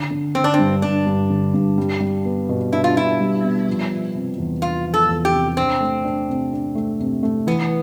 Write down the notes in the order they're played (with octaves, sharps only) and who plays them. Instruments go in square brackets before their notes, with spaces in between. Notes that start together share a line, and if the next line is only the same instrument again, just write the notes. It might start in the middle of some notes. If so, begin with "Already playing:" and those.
Already playing: [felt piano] D3
D3
[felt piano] D3 [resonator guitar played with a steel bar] C4
[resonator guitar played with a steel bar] D4
C4
[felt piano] G2
[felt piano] G2 [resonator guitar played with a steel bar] D4
[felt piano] G2
D3
G2
G3
G3
B3
B2
[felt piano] D4 [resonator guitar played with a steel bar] E4
[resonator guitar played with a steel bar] F4
[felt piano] D4 [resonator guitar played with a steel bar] E4
[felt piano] G3
B3
F3
F3
C3
E2
[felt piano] B3 [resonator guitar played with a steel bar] F4
[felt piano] F3
[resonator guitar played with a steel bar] A4
[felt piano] E2
[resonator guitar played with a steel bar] G4
[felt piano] C3
[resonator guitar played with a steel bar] C4 [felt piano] D4
[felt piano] A3
D4
C3
D4
A3
C3
A3
[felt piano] E3 [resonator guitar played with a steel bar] B3